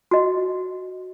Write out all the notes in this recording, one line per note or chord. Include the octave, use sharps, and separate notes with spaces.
F#4 D#5